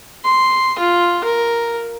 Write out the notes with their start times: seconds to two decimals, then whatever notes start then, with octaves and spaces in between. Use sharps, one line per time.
0.24 C6
0.79 F4
1.24 A#4